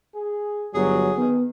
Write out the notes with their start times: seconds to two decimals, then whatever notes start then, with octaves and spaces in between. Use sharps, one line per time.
0.15 G#4
0.74 G1 F#3 G#4
1.17 D#3 B3